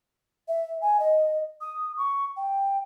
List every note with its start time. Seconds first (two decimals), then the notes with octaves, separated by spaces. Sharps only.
0.48 E5
0.81 G#5
1.00 D#5
1.61 D#6
1.97 C#6
2.37 G5